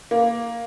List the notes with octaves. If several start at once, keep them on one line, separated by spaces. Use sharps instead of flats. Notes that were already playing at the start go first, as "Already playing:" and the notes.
A#3